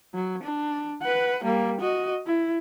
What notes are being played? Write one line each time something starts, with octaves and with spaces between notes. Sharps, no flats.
F#3
D4
B4 F#5
G3 A#3
F#4 D#5
E4